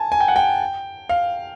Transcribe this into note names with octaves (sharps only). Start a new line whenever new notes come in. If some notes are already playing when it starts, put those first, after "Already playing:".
Already playing: G#5 A5
G#5
G5
F#5
G5
F5